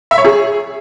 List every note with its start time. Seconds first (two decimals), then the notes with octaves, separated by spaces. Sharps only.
0.11 E5
0.18 C#5
0.25 G#4